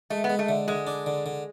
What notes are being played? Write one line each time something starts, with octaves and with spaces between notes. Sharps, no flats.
G#3 A3
B3
G#3
A3
D3
D3 G#3
D4
D3
D3